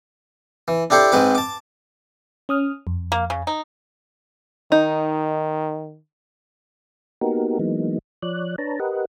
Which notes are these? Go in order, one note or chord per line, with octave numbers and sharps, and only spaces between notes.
E3
D4 E4 G4 A4 C5
G#2 G#3 C4 B4 D6
A5 D6
C#4 D#6 F6
F2
A#3
C#3
D#4
D#3 D#4
A#3 B3 D#4 F#4 G4 A#4
E3 F#3 G#3 A#3 B3 D#4
F3 C#5 D5 F#6
D4 B4 C#5 A5 A#5
G4 A#4 B4 D#5 F#5